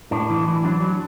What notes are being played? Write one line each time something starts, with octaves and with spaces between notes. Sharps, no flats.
A2 D4
E3
E3
F#3 D4
F#3